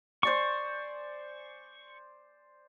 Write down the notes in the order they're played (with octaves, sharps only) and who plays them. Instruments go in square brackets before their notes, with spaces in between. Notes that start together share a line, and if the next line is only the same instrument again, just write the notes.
[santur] C5 D5 G#5 [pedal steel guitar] C#6